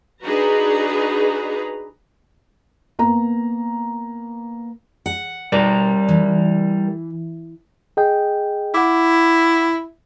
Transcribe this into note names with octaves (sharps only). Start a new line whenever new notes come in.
D4 D#4 F#4 G#4 B4 A#5
A#3 B3 A#5
F#5
B2 G3 A#4 D5
E3
G#4 D#5 G5
E4 F#5 D6